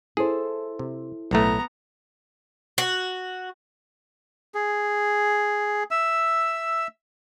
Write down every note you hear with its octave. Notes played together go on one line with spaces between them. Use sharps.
E4 G#4 A4 C5
C3
B1 A2 A3 B3 A#5
F#4
G#4
E5 E6